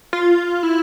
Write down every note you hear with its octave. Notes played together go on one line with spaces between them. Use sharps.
F4
E4